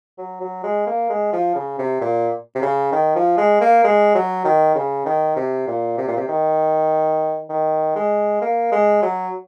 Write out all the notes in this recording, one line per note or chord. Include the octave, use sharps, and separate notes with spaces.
F#3
F#3
G#3
A#3
G#3
F3
C#3
C3
A#2
C3
C#3
D#3
F3
G#3
A#3
G#3
F#3
D#3
C#3
D#3
C3
A#2
C3
A#2
C3
D#3
D#3
G#3
A#3
G#3
F#3